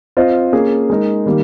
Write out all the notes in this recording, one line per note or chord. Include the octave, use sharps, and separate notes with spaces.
C4 F4 C5 D#5
A#3 C#4 G#4
G#3 D#4 A#4
D#3 G3 A#3